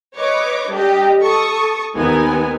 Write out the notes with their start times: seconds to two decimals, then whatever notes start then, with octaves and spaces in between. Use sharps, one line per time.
0.17 B4 C#5 D#5 D6
0.71 G3 D4 G4 D#5
1.21 A4 A5 C#6 D#6
1.96 D#2 B3 C4 D#4 A#4 G#5